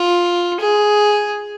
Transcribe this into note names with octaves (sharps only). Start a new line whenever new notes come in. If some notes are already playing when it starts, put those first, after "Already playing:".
Already playing: F4
G#4